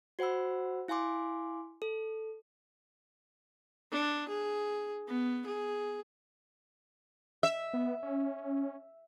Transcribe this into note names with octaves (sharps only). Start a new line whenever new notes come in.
F#4 C5 F#5 B5 E6
E4 F5 G#5 C6 D6
A4
D4
G#4
B3
G#4
E5
B3
C#4